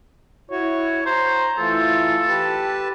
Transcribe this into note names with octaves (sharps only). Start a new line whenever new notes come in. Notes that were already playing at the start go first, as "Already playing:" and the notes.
E4 F#4 C#5
C5 A#5
E3 A3 F4 A4
G4 B4 A5